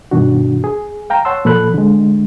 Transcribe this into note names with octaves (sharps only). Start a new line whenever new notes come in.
G2 B2 D#3 D4 F#4
G#4
F5 G5 A#5
C#5 F#5 A5 C6 E6
A#2 F3 A4 B5 F#6
D3 G#3